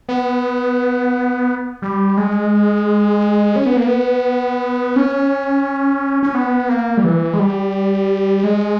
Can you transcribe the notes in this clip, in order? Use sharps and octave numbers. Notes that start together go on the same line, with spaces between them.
B3
G3
G#3
C#4
B3
A#3
B3
C#4
C#4
B3
A#3
G3
E3
G#3
G3
G#3